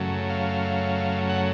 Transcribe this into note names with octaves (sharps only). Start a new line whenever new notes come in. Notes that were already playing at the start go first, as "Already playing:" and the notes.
Already playing: F#2 C#3 F#3 A3
F5
F#5